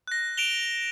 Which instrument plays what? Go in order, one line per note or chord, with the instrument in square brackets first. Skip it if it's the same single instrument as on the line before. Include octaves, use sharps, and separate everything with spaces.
[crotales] F#6 A#6
D7 E7 F7 G7